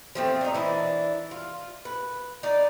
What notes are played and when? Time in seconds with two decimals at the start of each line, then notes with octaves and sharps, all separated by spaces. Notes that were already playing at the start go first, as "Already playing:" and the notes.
0.15 F3 A3 C4
0.41 D4 D#4
0.54 E3 D4 E4
1.31 F4
1.85 B4
2.43 D#4 D5